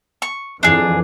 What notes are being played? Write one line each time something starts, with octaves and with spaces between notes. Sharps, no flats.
C#6
F2 E3 D4 G#4